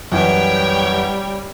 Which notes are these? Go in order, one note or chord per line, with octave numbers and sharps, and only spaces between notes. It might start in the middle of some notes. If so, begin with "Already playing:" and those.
F#2 E3 G3 C#5 G5